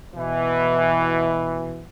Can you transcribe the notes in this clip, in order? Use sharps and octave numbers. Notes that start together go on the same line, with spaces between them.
B2 E3